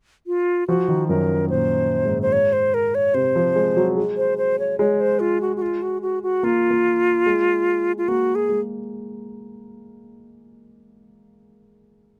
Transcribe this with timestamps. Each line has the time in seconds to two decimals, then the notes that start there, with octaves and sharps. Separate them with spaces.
0.27 F4
0.68 F3 F#4
0.88 D#3
1.09 F#2 A#4
1.50 A#2 C5
2.05 G#2
2.22 C5
2.32 C#5
2.53 C5
2.74 A#4
2.95 C#5
3.14 C3 C5
3.36 F3
3.56 G#3
3.76 F#3
3.97 G#3
4.17 C5
4.38 C5
4.59 C#5
4.79 G#3 C#5
5.00 C5
5.20 F4
5.41 F#4
5.57 F#4
5.62 F4
5.82 F#4
6.02 F#4
6.23 F#4
6.43 A#3 F4
6.71 A#3
7.26 G#3
7.98 F4
8.08 A#3 F#4
8.35 G#4
8.49 G#3